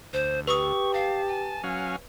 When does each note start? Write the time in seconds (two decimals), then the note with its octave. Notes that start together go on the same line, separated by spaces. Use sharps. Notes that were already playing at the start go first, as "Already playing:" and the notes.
0.13 D2 C5
0.47 G4 B4 C#6 D#6
0.94 F5 A5
1.27 G#5
1.64 F#3 C#4 F5